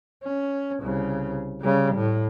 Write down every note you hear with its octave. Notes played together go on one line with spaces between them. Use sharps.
C#4
C2 C#3
C#3 G3
A2